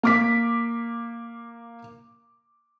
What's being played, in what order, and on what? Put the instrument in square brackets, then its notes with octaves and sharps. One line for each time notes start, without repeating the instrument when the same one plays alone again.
[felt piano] A#3 D6 B6